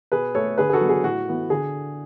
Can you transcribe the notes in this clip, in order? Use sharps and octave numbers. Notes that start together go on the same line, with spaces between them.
B2 G#4 B4
A3 A4 C#5
D3 G#4 B4
G#4
F#4 A4
F#3 B3
G#4
A2 F#4
E3 B3
D3 G#4